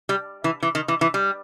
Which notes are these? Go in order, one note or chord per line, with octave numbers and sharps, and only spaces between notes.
G3
E3
E3
D#3
E3
E3
G3